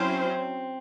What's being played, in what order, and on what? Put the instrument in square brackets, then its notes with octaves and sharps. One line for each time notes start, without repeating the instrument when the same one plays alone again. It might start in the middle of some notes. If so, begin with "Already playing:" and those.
Already playing: [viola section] F#3 C#4 E4 C5 [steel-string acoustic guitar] C4